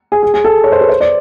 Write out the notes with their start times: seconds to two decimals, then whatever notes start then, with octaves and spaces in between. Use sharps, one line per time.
0.12 G#4
0.23 G#4
0.34 G#4
0.44 A4
0.64 C#5
0.72 C5
0.81 B4
0.89 C5
1.01 D5